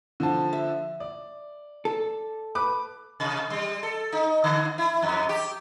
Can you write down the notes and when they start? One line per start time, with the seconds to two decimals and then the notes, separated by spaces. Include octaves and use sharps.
0.20 D3 F3 A5
0.53 E5
1.00 D5
1.85 A4
2.55 B4 B5 D6
3.20 C3
3.50 G3
3.83 A4
4.12 D#4
4.44 D3
4.78 E4
5.02 F2
5.29 G4